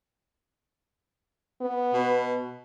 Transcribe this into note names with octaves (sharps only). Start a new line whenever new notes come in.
B3
B2